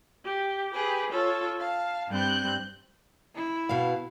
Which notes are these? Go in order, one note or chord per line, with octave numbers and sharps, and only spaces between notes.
G4
G4 G#4 B4
F4 A4 C#5
F5 A5
G2 G3 C4 F#6 G6
E4
B2 F5